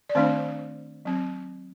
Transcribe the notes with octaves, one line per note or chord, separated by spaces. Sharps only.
D5
D#3 A3 C4 D4 C5
F#3 C4